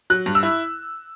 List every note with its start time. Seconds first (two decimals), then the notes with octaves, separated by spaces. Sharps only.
0.10 F#3 F#6
0.26 G2
0.35 E6
0.43 E4